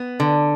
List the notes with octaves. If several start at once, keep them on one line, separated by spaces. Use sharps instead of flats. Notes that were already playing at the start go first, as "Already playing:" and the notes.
Already playing: B3
D3